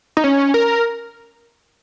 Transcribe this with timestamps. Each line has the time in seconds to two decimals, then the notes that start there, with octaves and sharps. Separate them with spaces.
0.17 D#4
0.24 C#4
0.54 A#4